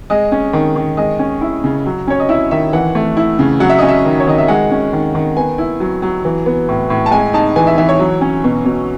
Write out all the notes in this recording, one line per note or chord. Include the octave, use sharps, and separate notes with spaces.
G#3 D#5
C#4
D#3
D#3
G#3 D#5
C#4
E4
C#3
F#3
C#4 C#5
D#5
E4 E5
D#3 E5
E3 F#5
A3
E4
C#3
F#3 F#5
E5
C#4 D#5
E5
D#3
C#5
D#3 D#5
E5
G#3 F#5
C#4
D#3
D#3
B3 G#5
E4
F#3
F#3
E3
B3
A2
A2
A5
G#3 G#5
D#4 A5
E3 G#5
E5
E3 E5
C#5
F#3
C#4
B2
B2